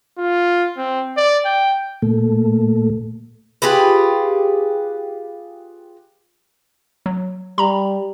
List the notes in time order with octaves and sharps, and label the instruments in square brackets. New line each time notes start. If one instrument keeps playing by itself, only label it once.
[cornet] F4
C4
D5
G5
[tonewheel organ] A#2 A3
[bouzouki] F4 G4 G#4 B4
[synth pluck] F#3
[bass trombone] G3 [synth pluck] A#5 B5